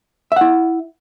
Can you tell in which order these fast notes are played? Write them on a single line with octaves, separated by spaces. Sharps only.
E5 F#5 E4